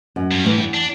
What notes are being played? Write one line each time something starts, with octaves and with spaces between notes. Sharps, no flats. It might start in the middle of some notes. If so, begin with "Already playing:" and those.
F#2
G2
A2 E3
E2
D4